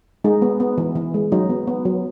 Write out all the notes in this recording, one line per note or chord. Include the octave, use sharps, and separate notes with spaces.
G#3 D#4
B3
B3
E3
E3
G#3
F#3 D#4
B3
B3
F#3